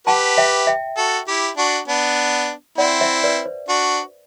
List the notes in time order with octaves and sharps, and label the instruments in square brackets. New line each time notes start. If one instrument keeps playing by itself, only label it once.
[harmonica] G4 B4 [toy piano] F#5 A5
[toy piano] E5 G5
E5 G5
[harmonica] F#4 A4
E4 G4
D4 F#4
B3 D4
[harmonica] C4 E4 [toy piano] D5 F#5
[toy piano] C5 E5
B4 D5
C5
[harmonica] D4 F#4